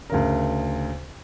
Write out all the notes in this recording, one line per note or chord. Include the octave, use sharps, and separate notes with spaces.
D2 C#3 A#4